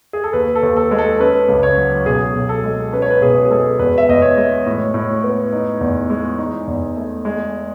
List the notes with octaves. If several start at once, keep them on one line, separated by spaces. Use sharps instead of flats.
G#4
A4
D#2 B4
A4
D#2
A4
G#3
A4
C#4 B4
C#2
C#5
F#3
B1 G#4
B1
A4
G#3
C#4 B4
C#5
B4
B1 G#4
G#4
G#3 A4
E2 B4
E5
E2 D#5
C#5
G#3
A2
A2
B3
D#4
E2
G#3
D#4
E2
A3
G#3